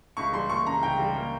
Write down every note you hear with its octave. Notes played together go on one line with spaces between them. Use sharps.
C#2 C#6
G3 C6
A#3 C#6
C#3 A#5
C#2 G5
G3
A#3